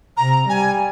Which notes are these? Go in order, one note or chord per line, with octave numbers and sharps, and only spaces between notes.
C3 A#5
G3 G#5